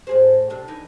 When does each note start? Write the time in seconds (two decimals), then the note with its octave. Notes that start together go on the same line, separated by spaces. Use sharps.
0.07 A2 G#4 C5
0.50 C3 D4
0.68 E3 D#4